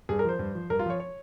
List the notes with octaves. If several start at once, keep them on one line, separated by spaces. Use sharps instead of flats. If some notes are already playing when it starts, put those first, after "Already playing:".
G2 G#4
A#4
F3 C5
G2
F3
G2 A#4
F4
F3 C#5
C#5